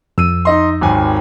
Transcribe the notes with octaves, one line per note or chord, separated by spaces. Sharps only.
F2 E6 D#7
D#4 D#5 C6
G#1 D#2 G#5